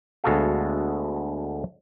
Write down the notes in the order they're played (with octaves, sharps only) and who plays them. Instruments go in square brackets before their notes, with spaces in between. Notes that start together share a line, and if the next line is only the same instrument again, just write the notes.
[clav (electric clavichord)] D2 G#3 B3 F#4 A4 F5